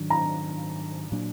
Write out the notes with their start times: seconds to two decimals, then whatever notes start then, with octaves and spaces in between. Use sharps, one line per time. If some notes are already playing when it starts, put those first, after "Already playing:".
Already playing: G#2 D#3 F#3 D4
0.10 A#5
1.12 A#2 F#3 D4